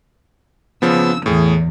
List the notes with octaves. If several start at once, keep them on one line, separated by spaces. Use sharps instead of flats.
C#3 F3 B3 E6
E2 A2 G#4